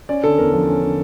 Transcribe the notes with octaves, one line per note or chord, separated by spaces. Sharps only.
C#4 D5
D3 A4
E2 A#4
F3 A#4
C#4
D3